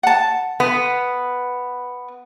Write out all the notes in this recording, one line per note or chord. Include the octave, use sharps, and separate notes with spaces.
F#5 A5
B3